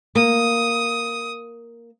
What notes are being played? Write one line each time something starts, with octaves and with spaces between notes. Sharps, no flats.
A#3 D#6